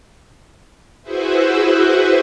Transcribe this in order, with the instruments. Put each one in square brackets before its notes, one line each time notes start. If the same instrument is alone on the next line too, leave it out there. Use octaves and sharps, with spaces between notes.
[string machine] E4 F#4 G#4 B4 C5 E5